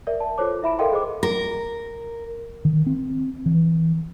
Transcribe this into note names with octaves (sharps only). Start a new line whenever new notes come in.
A#4 D5 E5
A5
F4 A4 C5 C#5 D6
E4 E5 B5 D7
A4 A#4 D#5 F5 G5 C6
G#4 C5 D#5 D6
A#4
D#3
C4
E3